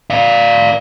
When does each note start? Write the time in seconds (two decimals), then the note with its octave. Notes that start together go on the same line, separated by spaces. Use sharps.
0.10 D5 F5